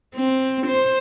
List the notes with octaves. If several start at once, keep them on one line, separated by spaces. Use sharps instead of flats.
C4
C5